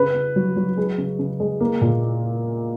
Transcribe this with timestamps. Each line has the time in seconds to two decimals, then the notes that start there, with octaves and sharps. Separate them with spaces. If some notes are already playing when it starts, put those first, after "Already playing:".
Already playing: C#3 B4
0.15 C#3
0.36 F#3
0.57 F#3
0.77 G#3
0.98 C#3
1.19 C#3
1.40 G#3
1.60 A#3
1.81 A#2